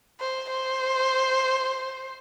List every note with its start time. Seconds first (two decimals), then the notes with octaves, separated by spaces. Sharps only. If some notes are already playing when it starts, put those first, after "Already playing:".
0.20 C5
0.51 C5